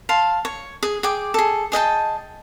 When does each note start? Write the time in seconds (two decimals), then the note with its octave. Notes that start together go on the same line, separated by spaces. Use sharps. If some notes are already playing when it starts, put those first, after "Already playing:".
0.09 F5 A5 C6
0.45 C#5
0.83 G#4
1.03 G#4 G5 D6
1.34 G#4 A4
1.72 G#4 D#5 G5 A5